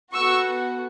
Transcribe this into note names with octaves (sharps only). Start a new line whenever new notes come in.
B3 F#4 A4 C#6 E6